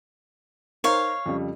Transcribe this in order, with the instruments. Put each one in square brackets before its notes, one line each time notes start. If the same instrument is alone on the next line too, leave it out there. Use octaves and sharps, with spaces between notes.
[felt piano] D#4 A#4 C5 [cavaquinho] C#5 F5
[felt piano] F2 C#3 G3